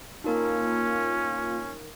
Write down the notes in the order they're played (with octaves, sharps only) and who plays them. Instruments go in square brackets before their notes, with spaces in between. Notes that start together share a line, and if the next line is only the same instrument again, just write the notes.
[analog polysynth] A#3 F4 [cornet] C#4 [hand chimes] D#4 A#4